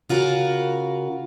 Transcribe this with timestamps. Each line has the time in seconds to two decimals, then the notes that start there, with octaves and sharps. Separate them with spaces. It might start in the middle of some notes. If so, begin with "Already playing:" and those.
0.09 C#3 F4 F#4 A#4